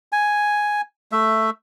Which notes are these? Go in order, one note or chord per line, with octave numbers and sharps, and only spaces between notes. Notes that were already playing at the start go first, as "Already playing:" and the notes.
G#5
A3 E5